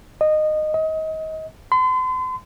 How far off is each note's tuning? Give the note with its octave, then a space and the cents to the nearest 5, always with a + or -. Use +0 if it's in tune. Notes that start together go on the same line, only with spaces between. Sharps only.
D#5 -20
D#5 +25
C6 -40